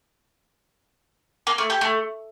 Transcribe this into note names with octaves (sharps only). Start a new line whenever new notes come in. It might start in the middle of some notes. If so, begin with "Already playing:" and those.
A#3
A3
G4
A3